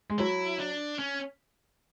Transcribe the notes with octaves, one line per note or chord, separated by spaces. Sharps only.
G#3
F#3 E4
D4
C#4